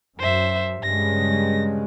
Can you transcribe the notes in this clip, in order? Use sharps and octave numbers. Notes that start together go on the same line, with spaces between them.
F#2 C5 E5
G2 C#3 G#3 A#6